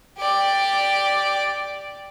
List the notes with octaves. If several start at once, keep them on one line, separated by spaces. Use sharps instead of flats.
G4 D5